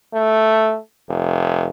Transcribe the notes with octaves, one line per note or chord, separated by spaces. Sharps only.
A3
F1